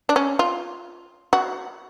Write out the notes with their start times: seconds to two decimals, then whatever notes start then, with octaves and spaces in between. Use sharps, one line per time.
0.09 D4
0.16 C#4
0.39 F4
1.33 F#4